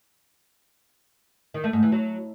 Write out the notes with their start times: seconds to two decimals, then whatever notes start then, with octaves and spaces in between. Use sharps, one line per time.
1.54 D#3
1.64 A3
1.73 G#2
1.83 E3
1.92 F#3